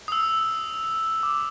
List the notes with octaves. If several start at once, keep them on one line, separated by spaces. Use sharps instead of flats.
D#6
E6
D6